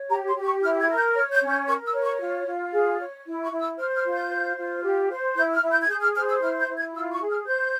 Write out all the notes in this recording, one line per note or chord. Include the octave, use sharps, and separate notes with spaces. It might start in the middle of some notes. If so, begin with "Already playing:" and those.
Already playing: C#5
G4 A#5
C6
G4
C#6
E4 F6
G#6
A#4
G6
C#5 F6
G6
C#4
G6
A#4 C#6
E6
C#5
C#6
F4
F4
G#4
C#5
E4
C#6
E4
E6
C5 F6
F6
F4
G6
C5
F4
G4
C5
E4 G6
F6
E4
G6
G#6
G#4 G6
F6
C5 F6
E6
E4 F6
G6
E4
G#6
F4 E6
C#6
G#4
F6
C5 G6